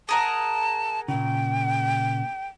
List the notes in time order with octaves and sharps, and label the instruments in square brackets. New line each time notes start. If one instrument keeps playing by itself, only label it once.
[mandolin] G#4 A#4 F#5 [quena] A5
[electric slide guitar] A#2 C#3 [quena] G5